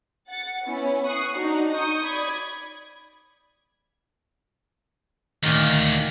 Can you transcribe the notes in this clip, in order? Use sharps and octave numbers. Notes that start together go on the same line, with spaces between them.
F#5 A6 C#7
B3 C#4 E4
C#6 D#6 F#6 C7
D4 D#4 F#4
D#4 C#6 D#6 G6
D5 B5 G#6
D2 A#2 D#3